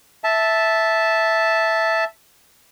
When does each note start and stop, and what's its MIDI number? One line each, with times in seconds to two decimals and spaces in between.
0.24 2.04 76
0.24 2.04 81